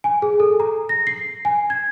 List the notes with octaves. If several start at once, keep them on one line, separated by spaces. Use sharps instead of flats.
G#5
G#4
A4
A#5
A#6
C7
G#5
G#6